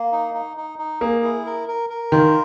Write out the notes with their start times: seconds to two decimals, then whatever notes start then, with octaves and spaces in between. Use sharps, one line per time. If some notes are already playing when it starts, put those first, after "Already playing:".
Already playing: A#3
0.12 D#4
0.34 D#4
0.57 D#4
0.79 D#4
1.01 A#3 G#4
1.24 E4
1.46 A#4
1.68 A#4
1.90 A#4
2.12 D#3 F4